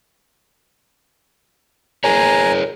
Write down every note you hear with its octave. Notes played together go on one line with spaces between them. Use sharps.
G#4 A#4 C#5 G#5 A#5